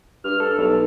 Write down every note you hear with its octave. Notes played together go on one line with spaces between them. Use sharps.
G2 F6
A4
B1